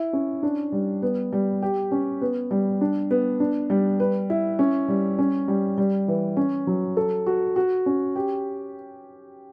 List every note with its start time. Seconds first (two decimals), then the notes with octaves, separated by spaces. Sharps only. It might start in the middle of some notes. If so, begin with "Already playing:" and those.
Already playing: E4
0.13 C#4
0.43 D4
0.72 G3
1.02 B3
1.33 G3
1.62 G4
1.92 C#4
2.21 B3
2.51 G3
2.81 D4
3.11 B3
3.40 D4
3.70 G3
4.00 B4
4.30 E4
4.59 C#4
4.88 G3
5.19 C#4
5.48 G3
5.78 G3
6.08 E3
6.37 C#4
6.67 F#3
6.97 A4
7.27 F#4
7.56 F#4
7.86 C#4
8.16 G4